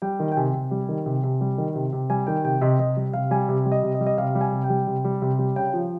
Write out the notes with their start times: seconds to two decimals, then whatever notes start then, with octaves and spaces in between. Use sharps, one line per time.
0.02 G3 G5
0.20 D#3
0.32 G5
0.37 C3 G#5
0.54 C3
0.71 G3
0.89 D#3
1.06 C3
1.24 C3
1.41 G3
1.58 D#3
1.75 C3
1.93 C3
2.10 G3 G#5
2.27 D#3 G5
2.45 C3 G5
2.61 C3 D#5
2.79 C3 D#5
2.97 G3
3.13 C3 F5
3.31 G3 G#5
3.48 C3
3.66 G3
3.72 D#5
3.83 C3
3.95 D#5
4.00 G3
4.06 D#5
4.18 C3 F5
4.35 G3
4.41 G#5
4.52 C3
4.64 G5
4.70 G3
4.87 C3
5.04 G3
5.22 C3
5.39 G3
5.56 C#3 G5
5.74 F3